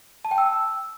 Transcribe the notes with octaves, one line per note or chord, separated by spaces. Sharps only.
A5
G5
E6